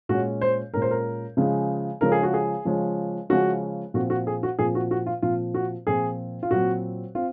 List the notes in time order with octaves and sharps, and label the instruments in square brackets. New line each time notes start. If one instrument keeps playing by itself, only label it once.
[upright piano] A#2 G#3 C#4 F#4
C5
A#2 G#3 C#4 A#4
C5
A#4
C#3 F3 G#3 C#4
C#3 F3 G#3 C#4 A#4
G#4
F#4
G#4
C#3 F3 G#3 C#4
C#3 F3 G#3 C#4 F#4
A#2 F3 C4 F#4
F#4
G#4
F#4
A#2 F3 C4 G#4
F#4
F#4
F4
A#2 F3 C4 F4
F#4
A#2 F3 C4 G#4
F4
A#2 F#3 C4 F#4
C4 F4